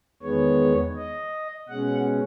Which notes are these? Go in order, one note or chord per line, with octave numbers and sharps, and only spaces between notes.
E2 D#3 G#3 B3 C#5
D#5
B2 G#3 C#4 F#5